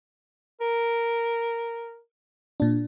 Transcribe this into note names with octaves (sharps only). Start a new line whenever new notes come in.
A#4
A#2 D4